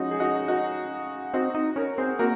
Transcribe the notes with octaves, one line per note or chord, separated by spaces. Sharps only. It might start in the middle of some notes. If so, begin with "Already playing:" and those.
Already playing: F3 G#3 C#4 D#4 F#4
G#4
D#4 F#4
D#4 F#4
C4 D#4 F#4
D#4
C#4 A#4 C#5
C4 G#4 C5
A#3 F#4 A#4